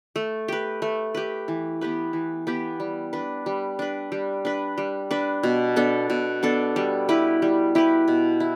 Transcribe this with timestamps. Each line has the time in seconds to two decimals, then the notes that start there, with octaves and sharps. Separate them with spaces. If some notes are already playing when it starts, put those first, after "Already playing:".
0.16 A3
0.48 G4 B4
0.82 A3
1.15 G4 B4
1.48 E3
1.81 B3 G4 B4
2.13 E3
2.47 B3 G4 B4
2.80 G3
3.13 D4 B4
3.46 G3
3.79 D4 B4
4.12 G3
4.45 D4 B4
4.78 G3
5.11 D4 B4
5.43 B2
5.76 B3 D4 A4
6.10 B2
6.43 B3 D4 A4
6.76 G3
7.09 E4 G4 B4
7.42 G3
7.75 E4 G4 B4
8.08 B2
8.40 E4